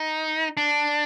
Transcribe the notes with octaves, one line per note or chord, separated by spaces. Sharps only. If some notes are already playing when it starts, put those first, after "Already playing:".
Already playing: D#4
D4